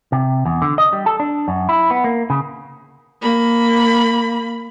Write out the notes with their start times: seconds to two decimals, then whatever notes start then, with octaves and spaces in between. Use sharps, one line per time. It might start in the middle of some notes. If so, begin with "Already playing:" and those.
0.12 C3
0.46 E2
0.62 D3
0.78 D#5
0.93 G3
1.06 A4
1.20 D4
1.48 F#2
1.69 E4
1.91 B3
2.04 A#3
2.30 C#3
3.21 A#3 B5